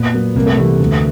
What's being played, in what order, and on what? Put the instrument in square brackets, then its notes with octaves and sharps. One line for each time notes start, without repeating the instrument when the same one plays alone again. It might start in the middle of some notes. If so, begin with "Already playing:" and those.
Already playing: [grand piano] A#2 [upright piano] B3
[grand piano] F#3 A#3
[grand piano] C2 [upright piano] A#3
[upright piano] A3
[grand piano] C3 E3 G3 [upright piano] A3
[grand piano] D2